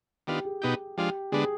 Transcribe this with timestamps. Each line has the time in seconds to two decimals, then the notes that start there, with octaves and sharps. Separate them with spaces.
0.27 D#3 B3 D4 F4 G4
0.45 G#4
0.62 B2 B3 D#4 G4
0.97 F3 G#3 D4 F4 G4
1.32 D3 G#3 B3 D4 G#4